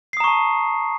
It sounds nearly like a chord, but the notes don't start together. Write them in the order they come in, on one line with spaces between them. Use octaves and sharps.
C7 D#6 A#5 C#6 A5